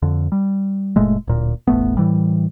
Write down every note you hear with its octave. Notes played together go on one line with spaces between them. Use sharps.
F2 D3
G3
F#1 A#2 G#3 A3
D1 A#2
E1 A1 A3 B3
A2 E3 G3